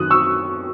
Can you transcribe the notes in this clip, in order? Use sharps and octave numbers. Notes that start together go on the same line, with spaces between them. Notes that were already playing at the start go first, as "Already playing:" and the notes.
Already playing: F#2 D#3 D#6 F#6
C#6 E6